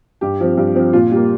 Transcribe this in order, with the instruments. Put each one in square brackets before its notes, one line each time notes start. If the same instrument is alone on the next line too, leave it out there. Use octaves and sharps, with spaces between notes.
[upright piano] G2 G4
F3 C4
G2
F3 C4
A#2 F4
G3 A#3